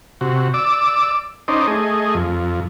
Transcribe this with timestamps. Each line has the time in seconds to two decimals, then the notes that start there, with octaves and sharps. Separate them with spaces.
0.21 C3 F#4
0.54 D5 D6 E6
1.48 C#4 D#4 C5 D5 D#5
1.67 A3 G#4 D#5
2.15 F2